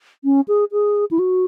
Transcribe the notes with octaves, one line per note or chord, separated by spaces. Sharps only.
C#4
G#4
G#4
E4
F#4